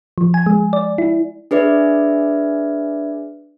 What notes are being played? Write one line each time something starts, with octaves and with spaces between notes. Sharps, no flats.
F3
G#5
G#3
D5
E4
D4 G#4 B4 D5 E5